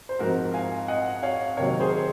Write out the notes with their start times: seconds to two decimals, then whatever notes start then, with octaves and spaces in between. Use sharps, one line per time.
0.09 C5
0.19 G#2 F3 C4 F#4 A#4
0.54 F5 G#5
0.88 D#5 F#5
1.23 C#5 F5
1.57 C3 D#3 F#3 A#3 A#4 C#5
1.80 G#4 C5